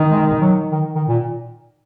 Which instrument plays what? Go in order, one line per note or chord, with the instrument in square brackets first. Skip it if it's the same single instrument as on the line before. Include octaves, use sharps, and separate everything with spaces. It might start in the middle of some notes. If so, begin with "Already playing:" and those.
Already playing: [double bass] D#3
[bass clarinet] G#3
F#3
D#3
D#3
A#2